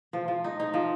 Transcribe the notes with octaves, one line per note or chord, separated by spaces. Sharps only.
F3
F3
D#4
D#4
F3